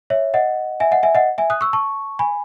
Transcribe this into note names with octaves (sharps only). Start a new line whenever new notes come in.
C#5 E5
D#5 F#5
E5 G#5
D#5 F#5
E5 G#5
D#5 F#5
E5 G#5
D#6 F#6
C#6 E6
A5 C#6
G#5 B5